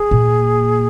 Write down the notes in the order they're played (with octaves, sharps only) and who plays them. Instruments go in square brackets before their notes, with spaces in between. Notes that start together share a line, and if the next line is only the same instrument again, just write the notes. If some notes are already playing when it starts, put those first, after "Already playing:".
Already playing: [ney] G#4
[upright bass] A#2